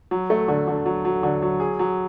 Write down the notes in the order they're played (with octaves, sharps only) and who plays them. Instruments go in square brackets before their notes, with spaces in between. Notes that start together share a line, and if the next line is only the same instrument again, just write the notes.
[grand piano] F#3
A3
D3
D3
F#3
F#3
D3
F#3
G#4
F#3